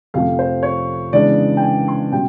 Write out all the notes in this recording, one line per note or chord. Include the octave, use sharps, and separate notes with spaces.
F2 C3 F3 A3 F5
C5
C#5
C#3 E3 G#3 B3 D4 D5
G5
G#5
C6
B2 G3 C#4 G5